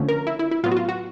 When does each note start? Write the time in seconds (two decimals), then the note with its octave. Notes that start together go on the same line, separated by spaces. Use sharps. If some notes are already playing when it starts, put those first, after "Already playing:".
Already playing: D3 F3 A3 C#4
0.09 A#4
0.27 E4
0.39 E4
0.51 E4
0.63 A2 F#3 B3 F4
0.72 F#4
0.77 F4
0.89 F#4